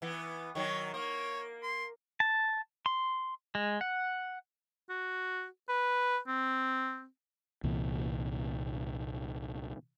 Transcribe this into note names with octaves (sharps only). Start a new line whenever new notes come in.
E3 B3
D#3 F#3 C#5
A#3 C#5
C6
A5
C6
G#3
F#5
F#4
B4
C4
C2 A#2 E3